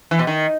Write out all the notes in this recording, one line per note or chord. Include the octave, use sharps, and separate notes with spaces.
E3
B2
D#3